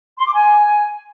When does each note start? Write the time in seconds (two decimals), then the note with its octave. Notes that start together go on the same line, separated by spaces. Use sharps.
0.17 C6
0.25 D6
0.33 G#5